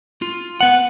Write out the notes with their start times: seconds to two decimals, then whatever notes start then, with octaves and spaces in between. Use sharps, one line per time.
0.22 F4
0.61 B3 F#5